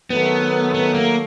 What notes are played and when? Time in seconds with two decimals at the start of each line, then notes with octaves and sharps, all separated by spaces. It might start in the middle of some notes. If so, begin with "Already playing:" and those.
0.10 D#3 F#3 A3 B3
0.74 B3
0.94 A#3